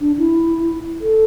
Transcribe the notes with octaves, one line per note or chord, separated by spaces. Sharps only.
D4
E4
A4